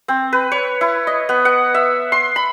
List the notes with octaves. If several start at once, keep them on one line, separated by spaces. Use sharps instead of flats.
C4
B4
C#5
E4
D#5
B3
F#5
E5
C6
B5